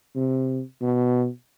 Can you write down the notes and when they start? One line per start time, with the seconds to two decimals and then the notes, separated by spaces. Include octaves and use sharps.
0.16 C3
0.82 B2